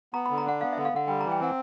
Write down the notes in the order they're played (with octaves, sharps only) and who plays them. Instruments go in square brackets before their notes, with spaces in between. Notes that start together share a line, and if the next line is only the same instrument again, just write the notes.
[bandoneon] B3 [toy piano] A#5
[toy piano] B5
[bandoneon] D3
[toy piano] A#5
[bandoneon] D4 [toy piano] F#5
[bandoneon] B3 [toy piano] F5
[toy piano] E5
[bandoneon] D3
[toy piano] F5
[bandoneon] D3 [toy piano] F#5
[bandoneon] G3 [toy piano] G5
[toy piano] A#5
[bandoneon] E3
[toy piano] G5
[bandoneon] C4 [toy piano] F#5